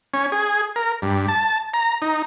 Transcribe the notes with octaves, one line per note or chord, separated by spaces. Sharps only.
C#4
G#4
A#4
G2
A5
A#5
D#4